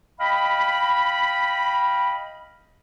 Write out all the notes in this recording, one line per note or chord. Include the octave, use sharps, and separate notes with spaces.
D#5 F5 G5 B5